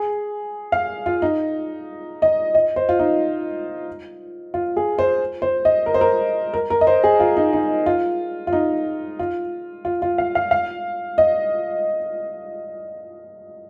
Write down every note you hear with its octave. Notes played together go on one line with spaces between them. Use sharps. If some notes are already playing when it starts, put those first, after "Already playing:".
Already playing: G#4
F5
F4
D#4
D#5
D#5
C5
F4
D#4
F4
G#4
C5
C5
D#5
A#4
C5
A#4
A#4
A#4
D#5
C5
G#4
F4
D#4
D#4
F4
F4
D#4
F4
F4
F4
F5
F5
F5
D#5